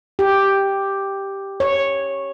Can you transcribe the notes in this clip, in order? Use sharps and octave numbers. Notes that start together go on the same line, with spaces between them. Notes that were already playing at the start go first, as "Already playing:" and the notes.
G4
C#5